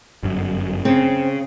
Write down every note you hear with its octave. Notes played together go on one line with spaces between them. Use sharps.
G1 F#2
C#3 C4